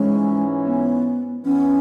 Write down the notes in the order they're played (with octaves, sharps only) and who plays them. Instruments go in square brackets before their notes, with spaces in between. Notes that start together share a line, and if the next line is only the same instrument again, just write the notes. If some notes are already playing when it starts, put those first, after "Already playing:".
Already playing: [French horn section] G#2 E3 C#4 [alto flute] G#3
[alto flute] B3
[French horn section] E2 E3 B3 [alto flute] C#4